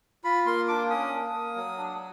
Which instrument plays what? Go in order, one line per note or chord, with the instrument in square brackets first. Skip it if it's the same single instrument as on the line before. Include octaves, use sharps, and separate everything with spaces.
[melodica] F4 B5
A#3 C6
D4 D6
C#4 D#6
A#3
A#3
F#3
D4